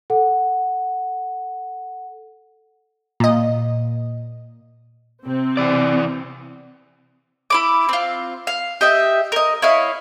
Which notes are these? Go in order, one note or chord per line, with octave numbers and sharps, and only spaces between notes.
A4 F#5
A#2 D#5
C3 C4
E3 D5
E4 B5 D6
C4 F4
F5
G4 D#5 E5
A#4 D#5
E4 C#5 D#5 F5